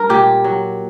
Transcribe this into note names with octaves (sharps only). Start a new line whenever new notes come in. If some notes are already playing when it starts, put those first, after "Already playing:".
Already playing: G2 A#4
A#2 G4
F#3